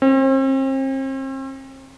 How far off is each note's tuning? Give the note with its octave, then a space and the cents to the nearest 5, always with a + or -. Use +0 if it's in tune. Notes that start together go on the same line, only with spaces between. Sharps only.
C4 +40